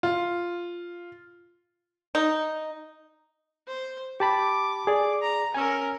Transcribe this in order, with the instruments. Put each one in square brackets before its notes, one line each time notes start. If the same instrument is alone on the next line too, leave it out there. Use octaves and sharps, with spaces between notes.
[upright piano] F4
[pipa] D#4
[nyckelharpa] C5
[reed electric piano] G4 A5 B5 [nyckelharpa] D6
[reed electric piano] G#4 D5
[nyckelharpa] A#5
[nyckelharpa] C#4 A#4 [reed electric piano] G#5 E6